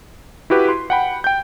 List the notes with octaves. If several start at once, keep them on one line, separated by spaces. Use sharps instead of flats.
E4 F#4 G4 B4
C6
F#5 G5 B5
G5 G6